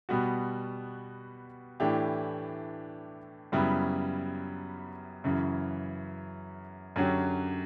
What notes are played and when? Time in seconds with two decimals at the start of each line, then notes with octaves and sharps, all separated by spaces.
0.09 B2 G3 B3 F#4
1.80 A2 E3 A3 D4 G4
3.52 F#2 C#3 G3 B3 E4
5.24 F#2 C#3 E3
6.96 F#2 D3 F#3 C#4 G4